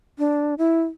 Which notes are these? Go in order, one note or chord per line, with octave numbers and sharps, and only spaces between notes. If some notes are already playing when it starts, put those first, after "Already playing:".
D4
E4